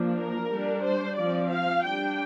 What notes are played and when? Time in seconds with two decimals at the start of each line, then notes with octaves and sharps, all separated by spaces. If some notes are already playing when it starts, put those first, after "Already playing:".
Already playing: F3 A#3 D4
0.16 A#4
0.50 G3 D4
0.83 C5
1.16 F3 C4 D5
1.50 F5
1.84 G3 D4 G5